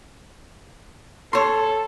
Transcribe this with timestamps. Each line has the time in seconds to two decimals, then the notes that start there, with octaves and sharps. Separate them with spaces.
1.33 A4 C#5 C6